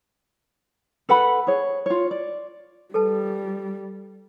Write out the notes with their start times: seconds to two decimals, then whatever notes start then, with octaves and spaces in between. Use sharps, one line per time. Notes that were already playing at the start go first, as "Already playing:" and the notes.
1.09 A4 B4 F#5 B5
1.47 G#4 C#5
1.86 F4 C#5
2.11 D5
2.94 G3 A4 B4 A5